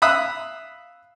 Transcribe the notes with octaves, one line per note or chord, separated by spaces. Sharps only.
E5 F5 B5 D#6 F#6